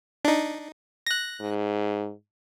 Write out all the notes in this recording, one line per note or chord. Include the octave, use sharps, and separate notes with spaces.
D4 D#4
F#6 A#6
G#2